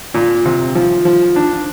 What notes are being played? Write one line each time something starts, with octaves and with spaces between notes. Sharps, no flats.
A#2
C3
F3
F3
D4